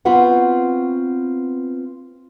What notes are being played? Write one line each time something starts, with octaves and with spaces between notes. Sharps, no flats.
B3 C4 F4 F#4 B4 F#5